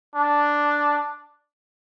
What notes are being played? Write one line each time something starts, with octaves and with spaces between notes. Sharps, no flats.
D4